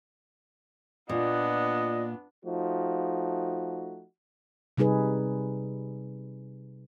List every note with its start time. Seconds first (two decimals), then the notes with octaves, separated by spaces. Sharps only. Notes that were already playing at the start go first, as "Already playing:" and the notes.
1.09 A#2 B3 D4 F4 D5 D#5
2.45 F3 A3 D#4 F#4
4.78 C3 G3 D#4 G#4 B4